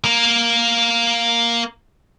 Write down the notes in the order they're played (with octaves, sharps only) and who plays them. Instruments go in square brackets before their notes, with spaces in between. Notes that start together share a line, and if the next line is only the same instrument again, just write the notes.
[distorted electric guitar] A#3 A#4